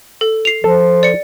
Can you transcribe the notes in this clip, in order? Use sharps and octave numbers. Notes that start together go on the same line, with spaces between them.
A4
C7 F7
F3 A4
D5 C#7